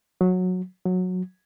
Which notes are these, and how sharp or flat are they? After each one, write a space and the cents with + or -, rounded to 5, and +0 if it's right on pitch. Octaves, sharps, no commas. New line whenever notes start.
F#3 -15
F#3 -15